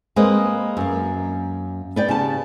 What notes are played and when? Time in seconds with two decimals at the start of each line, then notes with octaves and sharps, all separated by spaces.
0.16 G#3 A#3 C4 B4 D#5
0.77 F#2 A#3
1.96 B3 D5 G5
2.09 C#3 G4 A5